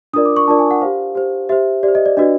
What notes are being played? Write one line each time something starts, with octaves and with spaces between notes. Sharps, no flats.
D4 F4 A#4 D5 D#6
D6
C#6
D4 F4 A#4 D5 A5
G#5
F#5
G4 C5 F5
G4 C5
G4 C5 E5
G4 D5
C5
D#5
D5
D4 F#4 B4 D5 D#5